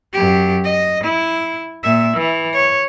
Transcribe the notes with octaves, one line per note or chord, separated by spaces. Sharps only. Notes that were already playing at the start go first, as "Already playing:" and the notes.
F#2 G4
D#5
E4
A#2 E5
E3
C#5